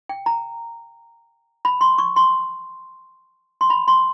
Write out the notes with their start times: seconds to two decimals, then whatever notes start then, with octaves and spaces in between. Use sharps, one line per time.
0.09 G5
0.26 A#5
1.65 B5
1.81 C6
1.98 C#6
2.16 C6
3.61 C6
3.70 B5
3.88 C6